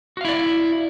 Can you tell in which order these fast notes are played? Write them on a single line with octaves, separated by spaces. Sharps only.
F#4 F5 E4 D5